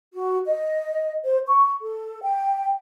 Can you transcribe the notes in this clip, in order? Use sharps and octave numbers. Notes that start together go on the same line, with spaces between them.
F#4
D#5
C5
C#6
A4
G5